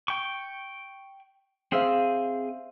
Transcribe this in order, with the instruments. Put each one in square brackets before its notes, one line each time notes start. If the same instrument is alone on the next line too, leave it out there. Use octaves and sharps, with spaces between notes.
[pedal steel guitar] G5 C#6
[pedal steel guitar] C4 G#4 [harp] C5 E5 F5